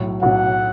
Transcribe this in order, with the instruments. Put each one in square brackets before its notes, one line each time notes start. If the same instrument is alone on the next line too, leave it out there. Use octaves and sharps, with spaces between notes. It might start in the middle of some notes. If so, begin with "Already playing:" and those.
Already playing: [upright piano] B1 A2 F#3
[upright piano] B1 A2 F#3 [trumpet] F#5